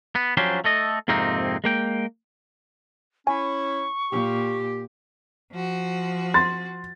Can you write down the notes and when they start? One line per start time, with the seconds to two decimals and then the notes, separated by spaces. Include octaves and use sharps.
0.15 B3
0.37 F3 F#3 C#4 D4 G4 C5
0.64 A3 A4 D#5
1.08 F2 G#2 C3 A#3 C4 D#4
1.64 G#3 A#3 G5
3.27 C#4 E4 G#5 C#6
4.11 A#2 G4
5.51 F3 F#4
6.34 C6 A6